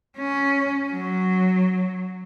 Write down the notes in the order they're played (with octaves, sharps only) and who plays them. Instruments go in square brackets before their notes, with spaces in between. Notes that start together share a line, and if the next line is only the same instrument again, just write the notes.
[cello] C#4
F#3